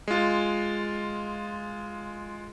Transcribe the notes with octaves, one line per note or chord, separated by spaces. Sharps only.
G#3 F4